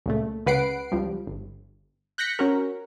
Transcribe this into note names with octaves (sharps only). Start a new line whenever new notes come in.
C#2 A#2 A3
C#2 C#3 B4 F#5 C7 D7
C#2 F3 G3
G1
F#6 G6 A#6 B6 C#7
C#4 F#4 A#4